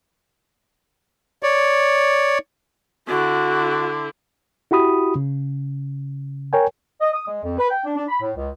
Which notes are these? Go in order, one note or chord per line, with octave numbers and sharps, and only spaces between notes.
C#5 D5
D3 E4 F#4
E4 F#4 G4 B5 D#6
C#3
A#4 C#5 G5 G#5
D#5
D#6
G#3
F2
B4
G5
D4
D4
B5
A2
C#2